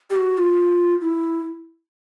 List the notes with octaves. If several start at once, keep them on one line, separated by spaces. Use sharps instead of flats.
G4
F#4
F4
E4